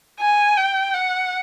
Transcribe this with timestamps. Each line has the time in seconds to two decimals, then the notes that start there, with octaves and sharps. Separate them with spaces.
0.20 G#5
0.58 G5
0.94 F#5